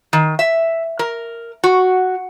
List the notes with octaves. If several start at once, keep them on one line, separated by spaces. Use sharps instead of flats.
D#3
E5
A#4
F#4